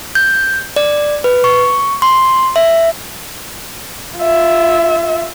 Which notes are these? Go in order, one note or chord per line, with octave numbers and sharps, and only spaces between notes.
G6
D5
B4
C#6
C6
E5
F4 E5